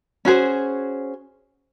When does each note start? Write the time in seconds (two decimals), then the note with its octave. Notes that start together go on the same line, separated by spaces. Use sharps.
0.25 C#4 F#4 G#4 C5